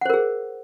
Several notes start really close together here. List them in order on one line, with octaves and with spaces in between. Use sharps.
F#5 C5 A#4 G#4